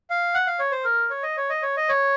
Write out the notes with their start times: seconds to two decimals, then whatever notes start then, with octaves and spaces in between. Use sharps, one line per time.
0.10 F5
0.34 F#5
0.47 F5
0.59 C#5
0.72 C5
0.85 A#4
1.10 C#5
1.23 D#5
1.37 C#5
1.49 D#5
1.62 C#5
1.77 D#5
1.89 C#5